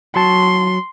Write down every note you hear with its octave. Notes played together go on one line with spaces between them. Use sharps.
F#3 F#4 A5 C6